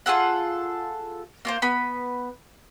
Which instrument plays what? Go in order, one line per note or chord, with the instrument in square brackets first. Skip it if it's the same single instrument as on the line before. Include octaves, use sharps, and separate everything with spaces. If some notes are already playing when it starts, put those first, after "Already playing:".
[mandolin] F4 G#4 A4 F#5
A#3 F4 C5
B3 B5